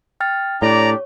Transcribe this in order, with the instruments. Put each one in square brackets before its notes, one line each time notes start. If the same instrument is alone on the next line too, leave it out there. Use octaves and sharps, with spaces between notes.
[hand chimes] G5 F6 A6
[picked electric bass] A2 [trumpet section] D4 G4 D5 [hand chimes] C#5 [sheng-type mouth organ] A#5